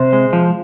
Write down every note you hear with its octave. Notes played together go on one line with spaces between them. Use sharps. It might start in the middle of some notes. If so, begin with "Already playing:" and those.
Already playing: C3 C5
G#3
F3